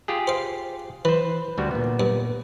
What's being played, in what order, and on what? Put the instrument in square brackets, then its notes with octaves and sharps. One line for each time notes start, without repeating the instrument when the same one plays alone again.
[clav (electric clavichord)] F4 G4 G#4
[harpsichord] C5 F5
[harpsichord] E3 [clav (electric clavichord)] B4 C5
[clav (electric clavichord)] D2 G3 F#4
A#2 B3
[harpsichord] G2